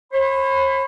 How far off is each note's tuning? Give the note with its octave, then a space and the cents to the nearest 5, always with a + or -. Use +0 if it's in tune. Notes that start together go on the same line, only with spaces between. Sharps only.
C#5 -45 B5 +20